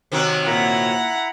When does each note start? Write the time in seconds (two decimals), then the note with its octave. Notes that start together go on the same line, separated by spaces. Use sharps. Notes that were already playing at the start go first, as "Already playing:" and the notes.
0.12 C3 D#3 F#3
0.47 A#2 E4 F#5 A#5 B5